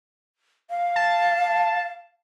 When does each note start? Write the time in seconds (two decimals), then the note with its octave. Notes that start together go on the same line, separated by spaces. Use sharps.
0.70 F5
0.96 A5